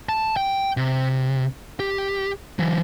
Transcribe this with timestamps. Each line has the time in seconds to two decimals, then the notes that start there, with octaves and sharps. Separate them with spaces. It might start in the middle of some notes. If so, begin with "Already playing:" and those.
0.09 A5
0.37 G5
0.77 C3
1.80 G4
2.59 E3 F#3